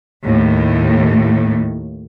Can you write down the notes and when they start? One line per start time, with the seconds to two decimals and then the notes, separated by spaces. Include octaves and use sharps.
0.24 D#2 A2